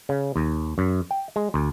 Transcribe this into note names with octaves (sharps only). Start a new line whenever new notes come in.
C#3
D#2
F#2
G5
G#3
D2